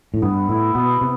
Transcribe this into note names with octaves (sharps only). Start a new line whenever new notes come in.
A2
G2 B3
A2 E4
B2 B3
C3